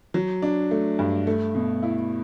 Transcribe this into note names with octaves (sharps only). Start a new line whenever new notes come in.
F#3
D4
A3
G2
A3
B2
E4